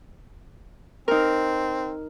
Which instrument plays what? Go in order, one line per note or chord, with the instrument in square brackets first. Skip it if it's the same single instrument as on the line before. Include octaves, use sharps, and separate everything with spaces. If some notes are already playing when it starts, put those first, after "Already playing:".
[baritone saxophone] C4 [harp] D#4 A#4